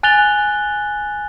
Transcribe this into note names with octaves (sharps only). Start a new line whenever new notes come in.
G#5 F#6 A6 F7 G7